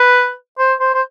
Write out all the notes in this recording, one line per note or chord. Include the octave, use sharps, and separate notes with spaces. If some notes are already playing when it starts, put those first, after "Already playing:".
Already playing: B4
C5
C5
C5